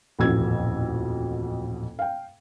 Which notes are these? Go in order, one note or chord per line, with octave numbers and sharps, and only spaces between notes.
D#1 A1 F2 B2 E6 G#6
F5 G5